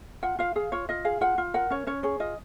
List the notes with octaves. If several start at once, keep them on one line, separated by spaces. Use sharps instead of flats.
F4 F#5
F4 F5
G#4 F5
F4 C#5
F4 D#5
G#4 F5
F4 F#5
F4
A#4 F#5
C#4 C#5
C#4 C#5
G#4 C#5
F4 D#5